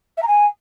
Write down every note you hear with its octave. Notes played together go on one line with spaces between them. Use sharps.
E5
A#5
G#5